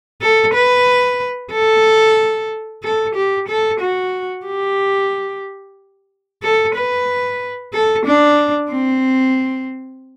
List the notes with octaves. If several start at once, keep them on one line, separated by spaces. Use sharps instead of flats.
A4
B4
A4
A4
G4
A4
F#4
G4
A4
B4
A4
D4
C4